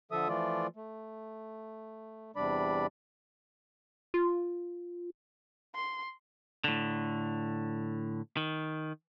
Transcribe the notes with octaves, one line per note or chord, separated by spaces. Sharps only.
D3 F3 A4 E5 D#6
E3 F3 A3 F4 D5
A3
E2 C3 G3 D4 D5 B5
F4
C6
A2 D3
D#3